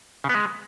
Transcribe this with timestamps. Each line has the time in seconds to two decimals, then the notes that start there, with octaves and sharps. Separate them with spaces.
0.24 C#3
0.29 B3
0.35 G#3